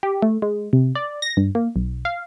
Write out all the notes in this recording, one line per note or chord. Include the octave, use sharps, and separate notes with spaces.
G4
A3
G#3
C3
D5
A#6
G2
A#3
B1
F5